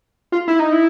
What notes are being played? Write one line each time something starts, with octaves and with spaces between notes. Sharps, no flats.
F4
E4
D#4
E4